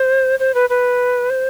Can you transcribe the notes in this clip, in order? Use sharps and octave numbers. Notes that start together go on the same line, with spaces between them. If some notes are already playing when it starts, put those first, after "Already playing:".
Already playing: C5
C5
B4
B4
C5